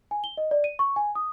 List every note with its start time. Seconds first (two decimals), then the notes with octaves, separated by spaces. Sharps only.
0.11 G#5
0.24 G7
0.37 D#5
0.51 D5
0.64 D#7
0.79 C#6
0.96 G#5
1.15 D#6